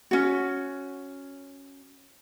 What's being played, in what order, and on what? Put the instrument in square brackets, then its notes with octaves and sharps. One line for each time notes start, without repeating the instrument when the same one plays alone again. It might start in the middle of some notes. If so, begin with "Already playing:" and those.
[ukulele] C#4 F#4